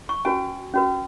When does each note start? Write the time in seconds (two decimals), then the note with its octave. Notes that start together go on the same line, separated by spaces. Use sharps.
0.09 C#6
0.25 C#4 F#4 B4 G#5
0.74 C#4 F#4 B4